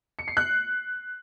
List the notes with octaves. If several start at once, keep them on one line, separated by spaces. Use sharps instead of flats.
C#7
C7
F#6